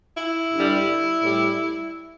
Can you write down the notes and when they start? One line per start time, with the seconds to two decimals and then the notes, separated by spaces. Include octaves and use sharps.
0.18 E4
0.52 G2 D3 G3
1.21 A2 G3